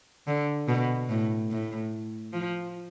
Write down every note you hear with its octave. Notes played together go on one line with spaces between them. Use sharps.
D3
B2
A2
A2
F3